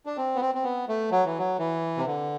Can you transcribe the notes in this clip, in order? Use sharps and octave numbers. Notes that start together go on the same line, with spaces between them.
D4
C4
B3
C4
C4
B3
A3
F#3
E3
F#3
E3
C3
D3